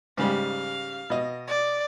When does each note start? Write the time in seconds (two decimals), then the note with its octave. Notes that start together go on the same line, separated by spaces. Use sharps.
0.18 G#2 C#3 G3 F5
1.10 B2 D#5
1.47 D5